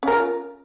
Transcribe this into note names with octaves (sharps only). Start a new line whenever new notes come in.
C#4 F4 A#4